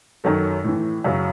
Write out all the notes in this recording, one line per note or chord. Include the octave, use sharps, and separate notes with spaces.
F#2 D#3 F#3 A4
A2 E3
F#2 C#3 F#3